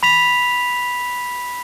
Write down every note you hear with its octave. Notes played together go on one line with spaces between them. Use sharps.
B5 B6 F7